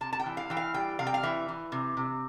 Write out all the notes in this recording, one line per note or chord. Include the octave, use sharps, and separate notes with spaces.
C3 A5
A5
G5
E3
F5
E3 G5
F5
G3 G5
C3 F5
G5
F5
E3 E5
E3
C3
C3